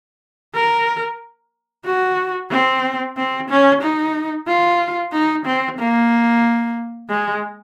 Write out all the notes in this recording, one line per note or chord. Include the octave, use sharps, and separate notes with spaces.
A#4
F#4
C4
C4
C#4
D#4
F4
D#4
C4
A#3
G#3